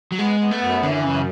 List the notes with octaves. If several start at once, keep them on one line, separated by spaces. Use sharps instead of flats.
F#3
G#3 B3
B3
A3
F#2
D3 E3
F#2 C#3